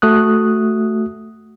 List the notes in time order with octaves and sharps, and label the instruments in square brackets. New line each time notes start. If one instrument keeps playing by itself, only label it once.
[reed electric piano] A3 F#4 D#6 F#6